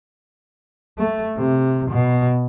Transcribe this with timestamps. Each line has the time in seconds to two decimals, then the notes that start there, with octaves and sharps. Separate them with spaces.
0.98 A3
1.38 C3
1.90 B2